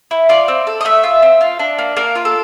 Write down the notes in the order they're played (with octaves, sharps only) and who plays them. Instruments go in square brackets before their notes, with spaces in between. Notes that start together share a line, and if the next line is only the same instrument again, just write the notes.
[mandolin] E4
F4 D5
C4
A4
D#5
A3 E5
F4
C4
F4
D4
A#3
A#3 A#4
F4
A4